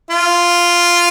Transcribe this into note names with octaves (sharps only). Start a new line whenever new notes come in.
F4